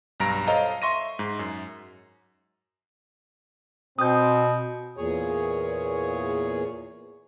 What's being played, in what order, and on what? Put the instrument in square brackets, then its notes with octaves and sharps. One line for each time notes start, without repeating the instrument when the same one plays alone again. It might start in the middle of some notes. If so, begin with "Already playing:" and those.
[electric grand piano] B1 G2 A#5 A#6 D7
A4 C5 C#5 D#5 F5 A#5
E5 C6 C#6 A#6 D#7
G#2
F#2
[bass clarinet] B2 [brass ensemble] C4 [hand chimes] D#6 G6
[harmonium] E2 A#2 G#4 C#5